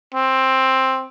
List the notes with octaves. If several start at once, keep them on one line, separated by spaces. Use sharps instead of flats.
C4